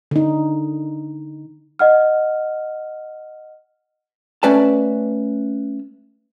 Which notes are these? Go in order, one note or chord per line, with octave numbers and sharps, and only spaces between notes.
D3 D#4
D#5 F#5 F6
A3 C#4 B4 D5 A5